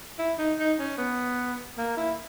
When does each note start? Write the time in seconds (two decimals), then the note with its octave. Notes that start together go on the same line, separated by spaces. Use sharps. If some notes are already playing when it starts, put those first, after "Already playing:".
0.19 E4
0.38 D#4
0.59 D#4
0.79 C#4
0.98 B3
1.78 A#3
1.97 E4